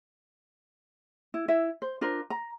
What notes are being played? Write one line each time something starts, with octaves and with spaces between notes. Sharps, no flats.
E4
E4 E5
C5
D4 F4 A#4 C5
A#5